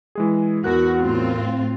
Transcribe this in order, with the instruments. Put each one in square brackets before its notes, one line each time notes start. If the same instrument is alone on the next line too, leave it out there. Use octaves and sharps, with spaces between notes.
[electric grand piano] E3 G#3 G#4
[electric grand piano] E2 A#4 F#6 [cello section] F#4
[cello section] A2 C4 F4